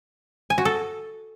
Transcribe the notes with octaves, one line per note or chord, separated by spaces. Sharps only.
G#5
F#4
A4